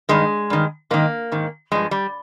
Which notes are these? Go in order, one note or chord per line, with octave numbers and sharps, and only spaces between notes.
G2 D#3 G#3
G2 D#3
G#2 D#3 A#3
G#2 D#3
G2 F3 G#3
G3